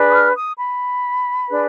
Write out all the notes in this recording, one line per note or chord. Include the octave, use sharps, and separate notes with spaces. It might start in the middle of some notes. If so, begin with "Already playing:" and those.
Already playing: D4 G#4 B4
D#6
F6
D#6
B5
D4 G#4 B4